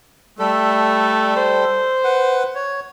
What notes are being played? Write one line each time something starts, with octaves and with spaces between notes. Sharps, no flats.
G3 A3 A4
C5
B4 F#5
C#5